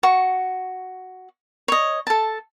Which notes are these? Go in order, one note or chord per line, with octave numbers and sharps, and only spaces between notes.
F#4 C#6
C#5 D#5
A4 A5